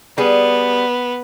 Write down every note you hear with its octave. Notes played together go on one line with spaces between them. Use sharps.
G3 B3 G#4